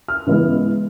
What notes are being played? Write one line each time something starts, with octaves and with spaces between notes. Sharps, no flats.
F6
C#3 E3 G#3 B3